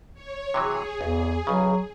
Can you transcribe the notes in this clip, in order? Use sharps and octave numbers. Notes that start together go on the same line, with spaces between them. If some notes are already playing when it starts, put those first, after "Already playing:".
C#5
C3 E3 F#3 G#4
B1 E2
B1 C#3 F#3